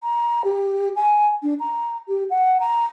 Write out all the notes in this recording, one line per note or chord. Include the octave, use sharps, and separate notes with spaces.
A#5
G4
G#5
D4
A#5
G4
F#5
A#5